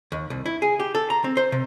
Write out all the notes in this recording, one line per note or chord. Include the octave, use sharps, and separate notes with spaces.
D#2
C2
E4
G#4
G4
A4
A#5
C4
C5
C3